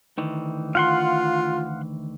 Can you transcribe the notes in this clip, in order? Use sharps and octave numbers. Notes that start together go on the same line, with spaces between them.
D2 D#3 E3
F4 F5 F#5 C6